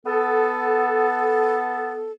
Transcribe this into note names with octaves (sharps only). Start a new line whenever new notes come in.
B3 A4